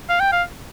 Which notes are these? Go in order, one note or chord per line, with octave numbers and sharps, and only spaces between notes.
F5
G5
F5